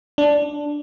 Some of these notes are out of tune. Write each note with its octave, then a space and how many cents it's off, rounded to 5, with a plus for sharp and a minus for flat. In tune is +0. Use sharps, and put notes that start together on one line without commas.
D4 -5